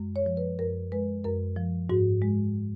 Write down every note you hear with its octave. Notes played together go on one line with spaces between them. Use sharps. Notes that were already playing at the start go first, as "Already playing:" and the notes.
Already playing: F#2 G#3
C#5
F3
B4
F#2 A#4
G#3 B4
F#2 A#4
F3
G#2 F#4
G#3